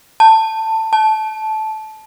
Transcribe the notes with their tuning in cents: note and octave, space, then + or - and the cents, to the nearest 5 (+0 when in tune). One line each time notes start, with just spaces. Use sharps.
A5 +15
A5 -15